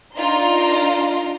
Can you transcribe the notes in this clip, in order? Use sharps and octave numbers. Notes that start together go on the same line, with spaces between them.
D4 D#4 F4 A#4 A#5 C6